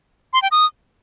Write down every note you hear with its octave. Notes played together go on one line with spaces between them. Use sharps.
C6
G5
D#6